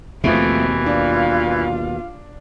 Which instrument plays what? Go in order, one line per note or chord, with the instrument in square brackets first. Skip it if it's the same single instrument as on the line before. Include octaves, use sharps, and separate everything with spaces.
[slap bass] D#2 B2 [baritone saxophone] E3 [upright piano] F3 A3 E5 [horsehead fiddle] C4
[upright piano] D4 [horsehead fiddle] F4 F5